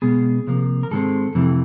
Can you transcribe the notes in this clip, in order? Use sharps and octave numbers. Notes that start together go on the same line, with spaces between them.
B2 G#3 B3 G#4
C3 F3 A#3
A#4
G#2 D#3 G#3 C4 A4
F2 C3 E3 A3